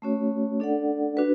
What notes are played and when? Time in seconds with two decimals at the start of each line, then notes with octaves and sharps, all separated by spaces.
0.02 A3 C#4 F#4 C#5
0.60 D4 A4 D5 F#5
1.17 D4 F#4 B4